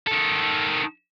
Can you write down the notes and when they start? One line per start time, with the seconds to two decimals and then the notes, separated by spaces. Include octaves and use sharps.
0.07 D#3 A4